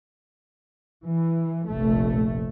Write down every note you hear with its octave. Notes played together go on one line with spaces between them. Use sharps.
E3
F1 A#1 A3